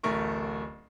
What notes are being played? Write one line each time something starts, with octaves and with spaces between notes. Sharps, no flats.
D1 A1 A3 A#4 C#6